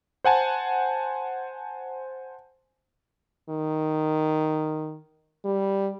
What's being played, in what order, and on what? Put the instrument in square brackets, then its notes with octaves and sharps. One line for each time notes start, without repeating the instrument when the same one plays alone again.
[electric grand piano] C5 F#5 G#5 A5
[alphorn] D#3
G3